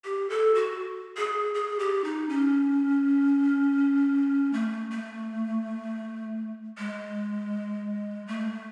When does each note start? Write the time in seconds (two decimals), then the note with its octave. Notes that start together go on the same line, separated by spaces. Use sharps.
0.05 G4
0.30 A4
0.55 F#4
1.17 G#4
1.54 G#4
1.79 G4
2.04 D#4
2.29 C#4
4.53 A3
4.91 A3
6.78 G#3
8.27 A3